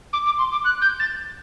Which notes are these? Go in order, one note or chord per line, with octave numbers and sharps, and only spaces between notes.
D6
D6
C6
D6
F#6
G6
A6